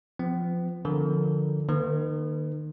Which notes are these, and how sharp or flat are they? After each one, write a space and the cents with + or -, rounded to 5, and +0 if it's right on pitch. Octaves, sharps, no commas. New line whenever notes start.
F3 +0 C4 -45
D3 +0 F3 -5 A#4 +0
D#3 -35 A#3 +0 B4 +35